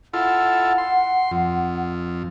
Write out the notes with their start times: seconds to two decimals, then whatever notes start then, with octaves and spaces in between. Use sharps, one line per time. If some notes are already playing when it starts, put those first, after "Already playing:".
0.14 E4 F4 A4 F#5
0.78 C6
1.31 F2